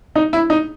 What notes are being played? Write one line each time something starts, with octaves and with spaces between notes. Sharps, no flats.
D#4
E4
D#4